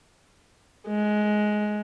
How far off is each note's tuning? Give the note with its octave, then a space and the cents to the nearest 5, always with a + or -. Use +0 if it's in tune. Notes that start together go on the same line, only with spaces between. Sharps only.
G#3 +15